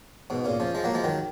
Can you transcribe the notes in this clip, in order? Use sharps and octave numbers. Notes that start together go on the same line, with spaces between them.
G#2 B2
A#2 C#3
C#3 F3
F3 G#3
F#3 A#3
F3 G#3
D#3 F#3